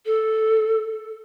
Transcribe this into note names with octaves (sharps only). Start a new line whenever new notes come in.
A4